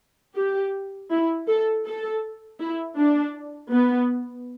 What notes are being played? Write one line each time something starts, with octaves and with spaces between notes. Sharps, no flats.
G4
E4
A4
A4
E4
D4
B3